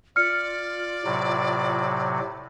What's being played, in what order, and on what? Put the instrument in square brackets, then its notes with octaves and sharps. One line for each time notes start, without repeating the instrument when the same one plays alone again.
[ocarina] F4 [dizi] D5 [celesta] F6 C#7
[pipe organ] A2 C3 F#3